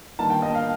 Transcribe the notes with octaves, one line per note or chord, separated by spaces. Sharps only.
G1 G2 D#3 A#3 A5
G5
D#5
F5